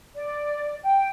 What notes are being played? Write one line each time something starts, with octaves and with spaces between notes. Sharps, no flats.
D5
G5